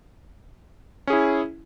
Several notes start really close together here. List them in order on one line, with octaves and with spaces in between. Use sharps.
C#4 G#4 E4